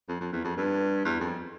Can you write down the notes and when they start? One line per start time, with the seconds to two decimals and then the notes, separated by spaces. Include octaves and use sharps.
0.08 F2
0.21 F2
0.33 E2
0.44 F2
0.57 G2
1.05 E2
1.20 F2